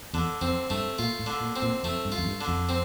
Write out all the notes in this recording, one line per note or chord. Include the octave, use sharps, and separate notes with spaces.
E2 D3
F2 C4
G2 A3
A#2 F4
A2
D3
A#2
C4
A#2
F2 A3
G2
F4
F2
G2
D3
F2
C4